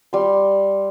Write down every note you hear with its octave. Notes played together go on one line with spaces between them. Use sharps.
G3 C6